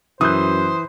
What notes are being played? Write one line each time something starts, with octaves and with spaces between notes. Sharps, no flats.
F#2 E3 C5 D#6 F#6 G6